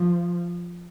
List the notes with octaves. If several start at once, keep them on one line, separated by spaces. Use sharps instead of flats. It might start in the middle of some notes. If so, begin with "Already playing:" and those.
Already playing: F3